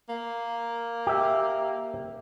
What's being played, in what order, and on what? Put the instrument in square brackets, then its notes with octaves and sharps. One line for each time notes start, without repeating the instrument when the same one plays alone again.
[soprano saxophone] A#3
[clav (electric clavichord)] G4 E5